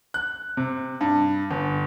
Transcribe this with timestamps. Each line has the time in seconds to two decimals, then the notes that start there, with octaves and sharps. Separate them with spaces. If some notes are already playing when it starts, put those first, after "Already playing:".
0.14 F#6
0.57 C3
1.01 G2
1.51 G1